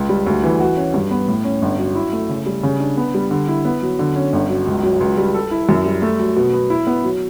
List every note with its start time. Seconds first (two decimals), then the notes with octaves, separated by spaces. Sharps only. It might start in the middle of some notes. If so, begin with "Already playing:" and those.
Already playing: C#2
0.09 G3
0.26 D2
0.44 E3
0.60 F#4
0.77 C#4
0.94 G2
1.11 B3
1.28 A2
1.45 C#4
1.62 G1
1.79 F#3
1.95 E4
2.13 A3
2.29 C#3
2.46 G3
2.63 C#3
2.80 D4
2.97 B3
3.14 G3
3.31 D3
3.48 E4
3.65 B3
3.82 F#3
3.99 D3
4.16 C#4
4.33 G1
4.49 F#3
4.67 C#2
4.83 F#3
5.00 C#2
5.17 G3
5.34 A4
5.51 E4
5.69 F#2
5.86 G3
6.02 A3
6.19 F#3
6.36 B2
6.53 B3
6.70 E4
6.87 B3
7.04 F#3